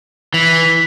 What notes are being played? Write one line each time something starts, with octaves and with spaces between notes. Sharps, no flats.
E3